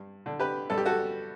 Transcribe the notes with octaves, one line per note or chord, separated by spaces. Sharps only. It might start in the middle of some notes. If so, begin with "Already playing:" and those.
Already playing: G2
D3
G4 B4
G2 A4
G4
F#4 A4